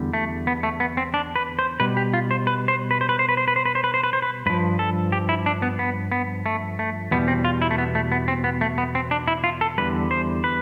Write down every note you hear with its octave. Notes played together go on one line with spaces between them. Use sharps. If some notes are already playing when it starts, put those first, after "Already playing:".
Already playing: E2 D3 G3
A3
B3
A3
B3
C4
D4
B4
C5
B2 G3 B4
G4
F4
C5
B4
C5
B4
C5
B4
C5
B4
C5
B4
C5
B4
C5
B4
C5
B4
C5
B4
G2 F3 B4
A4
G4
E4
D4
B3
B3
B3
A3
A3
E2 B2 G3 B3
C4
F4
E4
A3
B3
A3
B3
C4
B3
A3
B3
C4
D4
E4
F4
A4
E2 D3 G3 B4
C5
B4